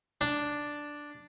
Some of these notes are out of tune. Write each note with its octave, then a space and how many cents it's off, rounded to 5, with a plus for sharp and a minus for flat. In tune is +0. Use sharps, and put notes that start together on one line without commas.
D4 +0